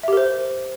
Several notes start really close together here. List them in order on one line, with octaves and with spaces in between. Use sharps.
E5 G4 A#4 C5